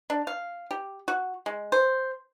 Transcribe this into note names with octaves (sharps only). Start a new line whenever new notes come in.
D4
F5
G4
F#4
G#3
C5